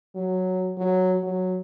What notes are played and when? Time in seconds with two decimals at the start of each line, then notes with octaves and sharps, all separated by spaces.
0.15 F#3
0.77 F#3
1.23 F#3